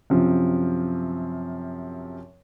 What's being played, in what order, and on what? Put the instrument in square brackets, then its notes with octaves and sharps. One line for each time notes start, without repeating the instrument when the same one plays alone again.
[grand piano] F#2 C3 F3